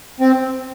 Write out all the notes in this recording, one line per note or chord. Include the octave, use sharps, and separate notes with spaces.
C4